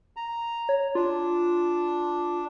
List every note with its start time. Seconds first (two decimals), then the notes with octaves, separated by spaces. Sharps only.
0.17 A#5
0.69 C#5
0.95 D4 F4